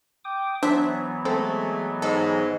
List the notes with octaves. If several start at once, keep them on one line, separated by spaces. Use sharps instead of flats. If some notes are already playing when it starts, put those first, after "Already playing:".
G5 D6 D#6
E3 F#3 B3 D4 C5 E5
G#3 A3 C4 A4 C5
G#2 A4